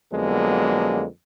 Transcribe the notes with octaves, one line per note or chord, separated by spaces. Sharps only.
F2 D3 F#3 G#3 A#3 B3